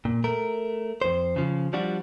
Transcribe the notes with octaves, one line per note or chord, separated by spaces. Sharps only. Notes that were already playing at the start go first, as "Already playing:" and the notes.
A#2
A3 A#4
F2 C5
C#3 F3
F3 G3 D4 F#4